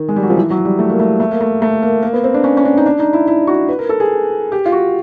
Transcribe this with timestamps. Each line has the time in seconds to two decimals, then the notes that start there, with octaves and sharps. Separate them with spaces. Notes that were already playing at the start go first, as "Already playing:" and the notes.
Already playing: D#3
0.09 G#3
0.16 G3
0.22 F#3
0.30 F3
0.37 E3
0.50 F#3
0.65 G3
0.79 A3
0.90 A#3
1.00 A3
1.20 A3
1.31 A#3
1.41 A3
1.62 A3
1.83 A#3
2.03 A#3
2.13 B3
2.24 C4
2.34 D4
2.44 C#4
2.57 C#4
2.65 D4
2.77 D#4
2.86 D4
2.99 D#4
3.13 E4
3.27 E4
3.47 F#4
3.69 B4
3.79 A#4
3.89 A4
4.00 G#4
4.52 G4
4.66 F4
4.72 F#4